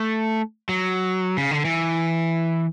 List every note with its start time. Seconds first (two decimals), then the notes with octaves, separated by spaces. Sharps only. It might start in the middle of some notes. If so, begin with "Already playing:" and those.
Already playing: A3
0.69 F#3
1.37 C#3
1.51 D3
1.65 E3